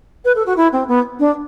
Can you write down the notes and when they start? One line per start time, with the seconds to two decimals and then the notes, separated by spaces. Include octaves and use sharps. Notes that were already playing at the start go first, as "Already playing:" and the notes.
0.25 B4
0.35 A4
0.46 F#4
0.57 E4
0.72 C4
0.88 B3
1.19 D4